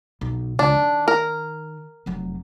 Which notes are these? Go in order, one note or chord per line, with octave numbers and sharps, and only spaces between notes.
B1
C#2 D4
D#3
A#4
F1 F#3